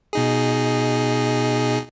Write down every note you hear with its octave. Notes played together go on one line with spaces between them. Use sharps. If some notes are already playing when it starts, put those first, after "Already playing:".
B2 D#4 G#4